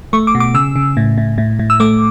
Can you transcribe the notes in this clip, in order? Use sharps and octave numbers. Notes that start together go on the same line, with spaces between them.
A3 C#6
D6
B2
D6
C#3 E6
C#3
A2
A2
A2
A2
E6
A3 D6